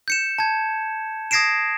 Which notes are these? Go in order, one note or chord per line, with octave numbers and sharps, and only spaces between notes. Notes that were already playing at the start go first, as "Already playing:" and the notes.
G6 C#7 E7
A5 G#6
D#6 G#6 A#6 C7 D7 E7